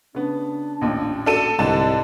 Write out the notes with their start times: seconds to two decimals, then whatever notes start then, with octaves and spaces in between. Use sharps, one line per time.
0.15 C#3 B3 D4
0.81 A1 D#2 A#2
1.26 D4 F#4 A4 D#7
1.59 C2 G#2 D3 D#5 A5